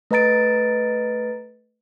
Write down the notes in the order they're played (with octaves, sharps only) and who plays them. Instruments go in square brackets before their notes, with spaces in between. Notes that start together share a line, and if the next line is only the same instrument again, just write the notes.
[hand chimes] A3 B4 D#5 A#5 A6 D7